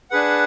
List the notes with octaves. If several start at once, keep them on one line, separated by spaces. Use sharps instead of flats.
D4 G#4 B4 F#5